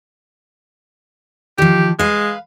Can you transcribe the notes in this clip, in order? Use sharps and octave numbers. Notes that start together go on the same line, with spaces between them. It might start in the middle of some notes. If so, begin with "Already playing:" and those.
D#3 F3 G4
G#3 B4 F5